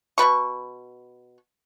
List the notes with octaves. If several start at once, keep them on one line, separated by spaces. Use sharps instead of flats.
B2 A3 B4 C#6